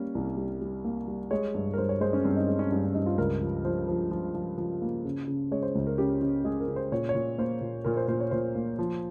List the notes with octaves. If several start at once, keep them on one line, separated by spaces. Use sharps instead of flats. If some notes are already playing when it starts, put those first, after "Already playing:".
Already playing: G3 A#3 C#4
C2
G3
G3
A#3
G3
G#3 C#5
G2
A#4
G2 C5
C#5
G#3 C5
C#4
G2 C4
D#4
G#3
C#4
G2 C#4
C#4
G2 D#4
F4
C#2 A#4
F3
F3 C5
F3
F3
F3
F3
A#3
C#3
C#3
G#3 C#5
C5
C#2
A#4
C#3 G4
C#3
G#3 G#4
A#4
C#3
C5
A#2 C#5
C#5
A#2
A#3 C5
A#2
A#2 A#4
C5
A#2 C5
C#5
A#2 C5
A#3
F3